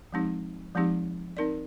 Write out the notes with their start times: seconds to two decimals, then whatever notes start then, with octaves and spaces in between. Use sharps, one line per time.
0.12 F3 G#3 C4 D#4 G4
0.75 F3 G#3 C4 D#4 G4
1.37 C4 D#4 A#4 D5